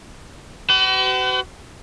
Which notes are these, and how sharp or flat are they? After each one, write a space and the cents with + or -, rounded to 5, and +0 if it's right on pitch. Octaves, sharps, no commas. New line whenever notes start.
F#4 +40 B4 +45